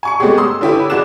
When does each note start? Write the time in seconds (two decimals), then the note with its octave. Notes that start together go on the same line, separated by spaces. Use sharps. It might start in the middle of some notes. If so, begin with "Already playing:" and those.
0.03 G#5 C#6 C#7
0.20 G#3 A3 B3 C#4 G4 G#4
0.37 C6 D#6 E6
0.61 D3 C#4 E4 G4 B4
0.90 F1 F#4 G#4 D5 F#6 E7